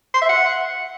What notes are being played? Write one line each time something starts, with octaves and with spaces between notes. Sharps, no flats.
C6
E5
F#5